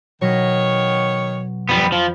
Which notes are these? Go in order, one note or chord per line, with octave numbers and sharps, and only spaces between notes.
B2 D#3 F#3 C#5 A#6
F2 G3 B3 B5
F3